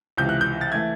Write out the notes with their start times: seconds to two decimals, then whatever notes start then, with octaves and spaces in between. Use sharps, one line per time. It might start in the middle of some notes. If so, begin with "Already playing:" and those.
0.17 C#2 C3 E3 G6
0.29 F#6
0.41 G6
0.61 A6
0.72 E3 A3 G#6